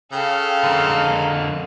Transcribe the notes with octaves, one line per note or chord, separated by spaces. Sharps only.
C#3 A4 F5 G5
F2 D3 A#4